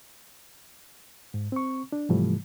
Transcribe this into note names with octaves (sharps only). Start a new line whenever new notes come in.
G#2
C4 C#6
D4
G#2 C3 E3 F3 G3 A3